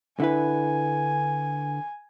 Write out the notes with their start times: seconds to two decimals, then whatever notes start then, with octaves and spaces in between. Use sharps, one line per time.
0.20 D3 E4 B4 G#5